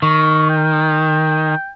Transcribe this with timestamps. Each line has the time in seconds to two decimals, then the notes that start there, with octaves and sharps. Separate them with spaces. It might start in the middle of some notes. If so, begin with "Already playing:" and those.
0.02 D#3 C#6
0.50 G5